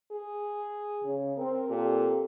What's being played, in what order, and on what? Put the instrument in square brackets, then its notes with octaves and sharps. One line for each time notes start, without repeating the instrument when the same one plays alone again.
[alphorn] G#4
[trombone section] C#3
[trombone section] C4 [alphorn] A#4
[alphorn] A#2 [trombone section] C4 G4 A4